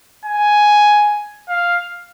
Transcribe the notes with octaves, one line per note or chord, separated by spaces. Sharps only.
G#5
F5